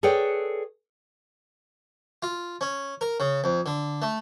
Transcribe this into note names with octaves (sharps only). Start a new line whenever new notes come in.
G#4 A4 B4 C#5 D5 G5
F4
C#4
A#4
C#3
F2
D3
A3